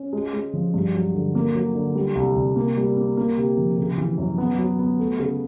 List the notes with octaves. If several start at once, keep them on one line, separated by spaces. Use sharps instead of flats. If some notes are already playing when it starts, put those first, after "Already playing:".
Already playing: C#4
G#3
G#3
F3
G2
F#3
D3
A#3
F#3
D3
G3
C2
C2
A#3
G3
A#3
A#3
C3
F3
C#3
E3
F#2
B3
F#3
B3
A3
C#3